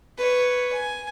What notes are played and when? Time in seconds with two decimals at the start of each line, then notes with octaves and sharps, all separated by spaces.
0.18 B4 C#5
0.73 G#5